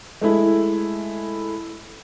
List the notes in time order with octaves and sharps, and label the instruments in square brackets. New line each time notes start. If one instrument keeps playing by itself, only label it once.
[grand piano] G#3 A3 E4